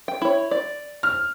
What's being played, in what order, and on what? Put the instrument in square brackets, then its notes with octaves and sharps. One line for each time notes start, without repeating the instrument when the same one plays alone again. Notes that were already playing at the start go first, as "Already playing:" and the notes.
[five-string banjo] G5
E4 C#5
D5
[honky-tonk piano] F6